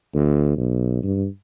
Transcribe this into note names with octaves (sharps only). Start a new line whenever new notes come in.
D2
B1
G2